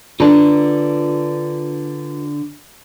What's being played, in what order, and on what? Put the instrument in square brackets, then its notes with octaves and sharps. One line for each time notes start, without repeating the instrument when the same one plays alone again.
[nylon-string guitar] D3 D4 [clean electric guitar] F4 B4 A#5